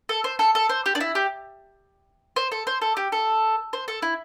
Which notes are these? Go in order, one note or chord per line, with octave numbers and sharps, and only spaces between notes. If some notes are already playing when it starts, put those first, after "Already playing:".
A4
C5
A4
A4
C5
G4
D4
E4
G4
C5
A4
C5
A4
G4
A4
C5
A4
E4